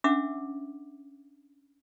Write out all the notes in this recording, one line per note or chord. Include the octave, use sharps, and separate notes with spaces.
C#4 D4 E5 F#5 D6 E6